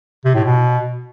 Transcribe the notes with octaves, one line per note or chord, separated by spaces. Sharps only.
C3
A2
B2